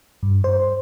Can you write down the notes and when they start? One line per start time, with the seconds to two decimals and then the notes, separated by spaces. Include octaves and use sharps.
0.23 G2
0.44 C5